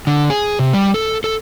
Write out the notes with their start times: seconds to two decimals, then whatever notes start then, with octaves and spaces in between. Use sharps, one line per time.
0.07 D3
0.30 G#4
0.59 C3
0.73 G3
0.94 A4
1.24 A4